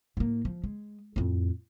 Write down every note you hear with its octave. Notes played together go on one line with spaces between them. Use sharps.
A2 A#3
F3
G#3
F2 A2